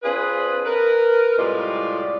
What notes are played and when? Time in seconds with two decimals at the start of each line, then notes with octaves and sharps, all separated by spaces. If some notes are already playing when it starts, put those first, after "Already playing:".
0.03 C4 D4 F4 G#4 B4
0.66 A#4 B4
1.38 A2 C3 G3 G#3 F4 D5